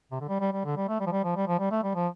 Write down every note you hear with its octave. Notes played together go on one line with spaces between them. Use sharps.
C3
D3
G3
G3
G3
D3
G3
A3
G3
F3
G3
F3
G3
F3
G3
A3
G3
F3